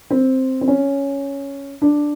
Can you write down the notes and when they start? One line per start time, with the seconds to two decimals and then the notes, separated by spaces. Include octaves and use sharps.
0.10 C4
0.61 C4
0.68 C#4
1.82 D4